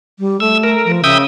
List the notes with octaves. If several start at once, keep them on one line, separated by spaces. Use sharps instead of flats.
G3
A3 E6
A#4
F3
C#3 E5 G5 D#6